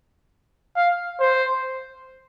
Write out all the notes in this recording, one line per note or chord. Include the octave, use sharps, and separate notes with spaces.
F5
C5